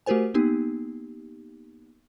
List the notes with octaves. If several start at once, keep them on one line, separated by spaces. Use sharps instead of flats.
A3 F#4 G4 A#4 C5 G#5
A#3 B3 D#4 G4